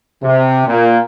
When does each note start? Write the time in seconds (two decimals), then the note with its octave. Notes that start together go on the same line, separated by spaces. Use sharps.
0.22 C3
0.68 A#2